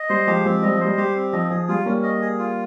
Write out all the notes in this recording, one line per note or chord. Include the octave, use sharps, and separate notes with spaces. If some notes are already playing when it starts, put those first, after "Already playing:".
Already playing: D#5
G3 C5
F3 G#3 G4
F3 G#3 C4
G3 D#5
F3
G3 C5
G3 G4
C4
F3 D#5
F3 G#4
G3 F4
G3 A#3 C#4
D#5
G#4
F4